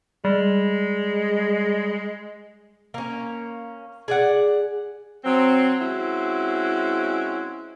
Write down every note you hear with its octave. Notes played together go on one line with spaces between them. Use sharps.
G3 G#3
A#3 C#4
G#4 D5 F#5
F#3 C4
G#3 C4 C#4 E4 F#4